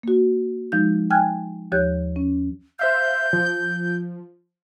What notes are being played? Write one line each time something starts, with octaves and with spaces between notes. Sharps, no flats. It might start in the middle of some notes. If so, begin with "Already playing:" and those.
A#3 F#4
F3 G#3 D#4 G6
G5 G#5 F6 F#6 G#6
D#2 F3 G4 C#5 F#6 G6
C#4
C5 E5 F5 G6
F3